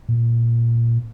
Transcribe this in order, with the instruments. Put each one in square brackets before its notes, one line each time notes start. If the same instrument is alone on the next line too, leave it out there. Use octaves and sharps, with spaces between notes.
[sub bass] A#2